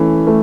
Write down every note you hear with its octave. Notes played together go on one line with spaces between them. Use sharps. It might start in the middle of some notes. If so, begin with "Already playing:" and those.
Already playing: E3 A3 C#4
A3